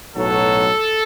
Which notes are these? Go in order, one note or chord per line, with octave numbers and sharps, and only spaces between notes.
B1 A2 F#3 A4